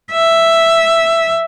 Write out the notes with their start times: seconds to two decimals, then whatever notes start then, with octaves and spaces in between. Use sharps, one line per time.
0.11 E5